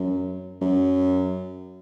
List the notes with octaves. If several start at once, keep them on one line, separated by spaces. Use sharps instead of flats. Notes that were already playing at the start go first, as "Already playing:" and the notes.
Already playing: F#2
F#2